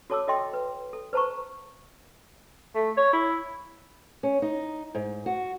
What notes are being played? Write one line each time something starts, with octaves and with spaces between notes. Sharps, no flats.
F#4 A4 C#5 A5 D6 E6
F#4 A4 D#5 E5 G5 C6
B4
A4
B4 C5 A5 A#5 C#6
A3
C#5
E4
C#4
D#4
G#2
F#4